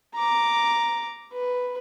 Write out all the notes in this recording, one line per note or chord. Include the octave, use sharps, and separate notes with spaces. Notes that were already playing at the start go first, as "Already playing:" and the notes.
A#5 D6
B4